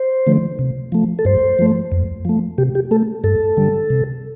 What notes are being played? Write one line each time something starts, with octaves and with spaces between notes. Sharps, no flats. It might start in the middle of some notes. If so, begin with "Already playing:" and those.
Already playing: C5
D3 F3 A3
C3
F3 A3
A4
G2 C5
F3 A3
F2
F3 A3
C3 G4
G4
A3 A4
G2 A4
D3 G3
C3